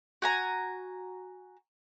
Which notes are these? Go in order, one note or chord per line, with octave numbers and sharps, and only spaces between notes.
F#4 G#5 A#5